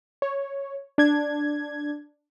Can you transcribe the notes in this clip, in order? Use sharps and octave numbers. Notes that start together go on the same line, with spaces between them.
C#5
D4 G#6